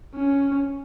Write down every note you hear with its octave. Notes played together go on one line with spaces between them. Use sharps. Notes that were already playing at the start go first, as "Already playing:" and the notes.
C#4